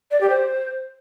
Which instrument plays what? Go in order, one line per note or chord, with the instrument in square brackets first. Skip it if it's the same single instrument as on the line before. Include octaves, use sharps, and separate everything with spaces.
[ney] D5
G4
C5